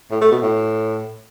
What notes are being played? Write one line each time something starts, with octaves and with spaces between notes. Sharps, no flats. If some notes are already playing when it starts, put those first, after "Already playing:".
A2
A3
B2
A2